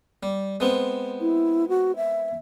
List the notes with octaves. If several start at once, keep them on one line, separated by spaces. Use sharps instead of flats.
G3
G#3 B3 C4
E4
F#4
E5